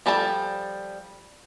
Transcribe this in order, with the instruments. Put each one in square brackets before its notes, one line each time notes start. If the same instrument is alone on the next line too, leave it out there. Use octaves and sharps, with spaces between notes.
[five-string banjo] F3 G3 A4 A5